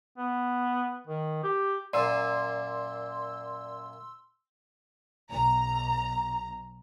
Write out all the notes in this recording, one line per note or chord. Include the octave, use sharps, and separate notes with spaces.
B3
D#3
G4
F#2 A#2 D5 C6 E6
B1 A#5